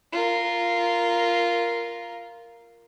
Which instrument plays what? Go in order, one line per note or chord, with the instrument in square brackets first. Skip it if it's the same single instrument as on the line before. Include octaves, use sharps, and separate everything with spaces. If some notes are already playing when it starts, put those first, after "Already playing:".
[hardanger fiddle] F4 A#4